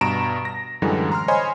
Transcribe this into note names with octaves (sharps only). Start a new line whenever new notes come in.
G2 B2 A#5 D7 E7
A#6
F#2 A2 D3 E3 G3 G#3
A#5 C6 F6
C5 C#5 D#5 G#5 B5 C6